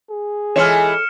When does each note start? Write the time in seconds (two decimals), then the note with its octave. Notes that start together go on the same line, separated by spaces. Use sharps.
0.10 G#4
0.56 E3 G#3 F4 A4 C#5 F6 C#7 E7